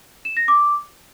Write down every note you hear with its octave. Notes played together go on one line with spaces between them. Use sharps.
E7
A#6
D6